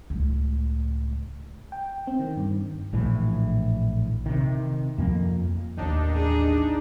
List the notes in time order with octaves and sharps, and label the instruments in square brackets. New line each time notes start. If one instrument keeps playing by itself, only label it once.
[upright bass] C#2 A2
[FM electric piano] G5
C4
D#3
G2
[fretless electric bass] A#1 A2 E3
C3 D#3
F2 A#3
[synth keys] A1 D#2 D#3 [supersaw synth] D4 D#4
[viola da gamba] G#4